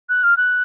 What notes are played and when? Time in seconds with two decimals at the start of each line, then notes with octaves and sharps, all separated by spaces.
0.09 F#6
0.23 F6
0.37 F#6